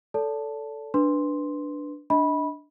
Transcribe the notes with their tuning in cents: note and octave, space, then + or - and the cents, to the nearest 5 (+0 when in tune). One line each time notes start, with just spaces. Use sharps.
A4 +0 D5 -40 A5 +0
D4 +0 B4 +0 C6 +0
D4 +0 D#5 +30 B5 -15